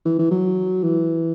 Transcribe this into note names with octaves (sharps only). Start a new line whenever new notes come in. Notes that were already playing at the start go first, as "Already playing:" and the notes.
E3
E3
F#3
E3